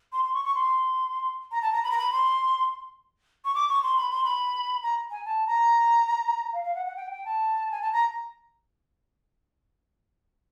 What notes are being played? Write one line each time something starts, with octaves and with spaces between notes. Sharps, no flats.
C6
C6
C#6
C#6
C6
A#5
A5
A#5
B5
A#5
B5
C6
C#6
D6
C#6
C6
B5
C6
B5
A#5
G#5
A5
A#5
F5
F5
F#5
F#5
G5
G5
A5
G#5
A5
A#5